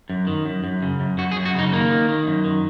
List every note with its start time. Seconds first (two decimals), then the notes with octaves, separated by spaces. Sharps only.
0.10 F#2
0.27 D#3
0.45 F#2
0.64 F#2
0.82 C#3
1.00 F#2
1.18 F#2 F#4
1.32 G#4
1.36 F#2
1.45 F#4
1.55 C#3 D#4
1.72 D#3 A#3
1.91 D#3
2.09 D#3
2.27 F#2
2.44 D#3